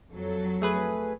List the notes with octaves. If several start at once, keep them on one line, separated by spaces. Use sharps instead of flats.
F2 F#3 A4
A3 G#4 B4